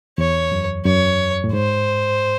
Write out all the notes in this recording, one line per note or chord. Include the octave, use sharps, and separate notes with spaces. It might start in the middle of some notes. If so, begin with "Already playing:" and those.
E2 C#5
F#2
F#2 C#5
A2
G#2 C5